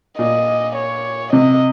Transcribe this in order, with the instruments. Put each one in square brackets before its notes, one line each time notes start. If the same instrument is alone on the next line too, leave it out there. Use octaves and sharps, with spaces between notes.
[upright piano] A#2 [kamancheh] D#5
[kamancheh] C#5
[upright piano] C3 [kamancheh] D#5